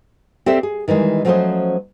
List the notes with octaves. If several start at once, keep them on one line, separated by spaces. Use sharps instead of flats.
C4 G4 A4 C5 D5 E5
G#4
D#3 E3 G3 G#3
F3 F#3 A3 C#4 C5 D#5